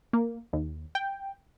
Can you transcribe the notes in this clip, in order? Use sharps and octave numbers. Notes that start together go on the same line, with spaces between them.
A#3
D#2
G5